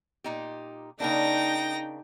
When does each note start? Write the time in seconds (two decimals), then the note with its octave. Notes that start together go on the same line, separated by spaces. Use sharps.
0.24 A#2 D#4 G4
1.00 C#3 A#3 D4 D#4 G5 A#6